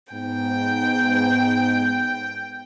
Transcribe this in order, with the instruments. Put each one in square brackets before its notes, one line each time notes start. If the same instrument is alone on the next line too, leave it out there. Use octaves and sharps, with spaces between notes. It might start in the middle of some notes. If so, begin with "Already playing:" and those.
[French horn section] G#2 B3 [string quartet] G5